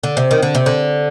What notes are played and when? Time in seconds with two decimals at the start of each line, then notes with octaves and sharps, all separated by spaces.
0.04 D3
0.17 C3
0.31 D#3
0.43 D3
0.55 C3
0.66 D3